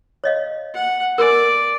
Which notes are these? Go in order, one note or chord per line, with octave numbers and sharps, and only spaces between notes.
C#5 D#5 F5
F#5
A#4 D5 G#5